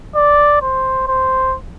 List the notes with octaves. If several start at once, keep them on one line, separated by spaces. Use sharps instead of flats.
D5
C5
C5